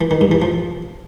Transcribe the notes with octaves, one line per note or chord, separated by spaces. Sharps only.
E3
D#3
G2
E3
F3